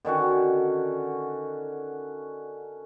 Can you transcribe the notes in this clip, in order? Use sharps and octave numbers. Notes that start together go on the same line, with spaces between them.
D3 D#3 C#4 F#4